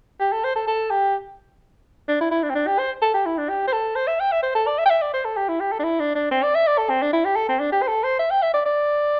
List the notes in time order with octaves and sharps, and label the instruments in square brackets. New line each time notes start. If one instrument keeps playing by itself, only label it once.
[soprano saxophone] G4
A4
C5
A4
A4
G4
D4
E4
E4
D4
C4
D4
G4
C5
A4
G4
E4
D4
G4
C5
A4
C5
E5
G5
E5
C5
A4
D5
E5
G5
E5
D5
C5
A4
G4
E4
G4
A4
D4
E4
D4
D4
C4
D5
E5
D5
A4
C4
D4
E4
G4
A4
C4
D4
G4
C5
A4
C5
E5
G5
E5
D5
D5